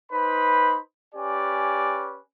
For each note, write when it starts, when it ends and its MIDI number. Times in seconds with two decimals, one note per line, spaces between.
0.11 0.78 63
0.11 0.78 71
0.11 0.78 72
0.11 0.78 83
1.15 2.18 61
1.15 2.18 67
1.15 2.18 71
1.15 2.18 74
1.15 2.18 80